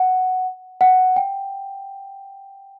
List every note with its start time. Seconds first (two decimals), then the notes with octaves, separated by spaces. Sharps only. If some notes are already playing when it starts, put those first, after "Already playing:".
Already playing: F#5
0.81 F#5
1.16 G5